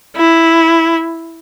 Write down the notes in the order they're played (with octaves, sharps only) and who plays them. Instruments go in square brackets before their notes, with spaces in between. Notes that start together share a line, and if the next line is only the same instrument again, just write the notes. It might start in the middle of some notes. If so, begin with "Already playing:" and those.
[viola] E4